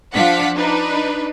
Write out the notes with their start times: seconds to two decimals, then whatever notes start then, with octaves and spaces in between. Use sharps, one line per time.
0.14 F3 D4 F5 F#5 B6
0.56 D4 D#4 B4